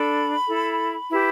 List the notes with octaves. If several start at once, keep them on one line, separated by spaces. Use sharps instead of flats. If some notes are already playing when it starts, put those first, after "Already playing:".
Already playing: D4 A4 B5
E4 A4
E4 G4 B4